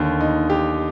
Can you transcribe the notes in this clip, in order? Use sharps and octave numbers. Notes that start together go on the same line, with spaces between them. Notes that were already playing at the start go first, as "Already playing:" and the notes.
Already playing: D#2 D3
D#4
G4